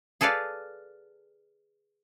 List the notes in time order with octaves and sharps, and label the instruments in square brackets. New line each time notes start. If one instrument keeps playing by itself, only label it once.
[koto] G#4 A4 B4 D5 F5